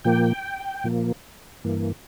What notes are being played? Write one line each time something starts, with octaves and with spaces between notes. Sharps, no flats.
A#2 F3 A#3 G5
A#2 F3 A#3
G2 E3 A#3